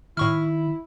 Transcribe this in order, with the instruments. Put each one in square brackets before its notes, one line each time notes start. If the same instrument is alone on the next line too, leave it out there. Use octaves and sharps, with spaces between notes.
[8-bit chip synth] A2 C#6 F6 [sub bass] D#3 [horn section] E4